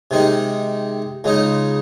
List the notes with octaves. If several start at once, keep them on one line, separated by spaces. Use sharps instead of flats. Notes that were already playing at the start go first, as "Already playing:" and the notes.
C3 D#3 G#3 D#4
C#2 C#3 G#3 D#4